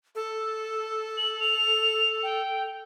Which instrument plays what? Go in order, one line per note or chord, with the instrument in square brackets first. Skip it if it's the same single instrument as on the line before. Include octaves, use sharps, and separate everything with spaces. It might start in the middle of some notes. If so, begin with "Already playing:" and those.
[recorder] A4
[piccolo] F#7
F7
G5